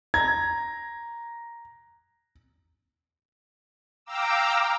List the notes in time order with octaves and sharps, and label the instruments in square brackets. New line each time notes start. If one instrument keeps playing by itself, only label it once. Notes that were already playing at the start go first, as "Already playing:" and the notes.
[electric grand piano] A#5 [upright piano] G#6
[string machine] F5 G5 A#5 D6 E6